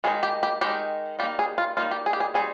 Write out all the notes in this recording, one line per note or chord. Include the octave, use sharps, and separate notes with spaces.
D#3 G#3 D#4 G#4
G4
G4
D#3 G#3 D#4 G4
G3 A#3 D#4 G4
G#4
F4
G3 A#3 D#4 F4
G4
G#4
G4
G#4
G3 C4 D#4 G#4